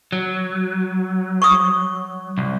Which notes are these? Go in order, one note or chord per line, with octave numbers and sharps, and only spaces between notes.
F#3
C#6 D#6
C2